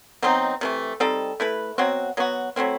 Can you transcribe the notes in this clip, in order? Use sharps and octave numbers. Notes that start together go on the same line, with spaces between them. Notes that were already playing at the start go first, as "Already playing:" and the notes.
B2 F#3 C4 D#4
C3 E3 A3
G3 C4 D#4 A4
A3 E4 B4
B2 F#3 C4 F#4
F#3 B3 F#4
F#3 A3 C4 E4